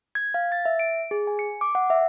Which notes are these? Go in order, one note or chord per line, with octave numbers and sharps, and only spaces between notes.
G#6
F5
A6
E5
D7
G#4
G#5
C#7
D6
F#5
E5